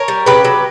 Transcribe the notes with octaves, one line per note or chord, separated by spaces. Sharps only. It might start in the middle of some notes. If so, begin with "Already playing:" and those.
Already playing: A#4 C#5
G3
C#3 G4 B4
F#3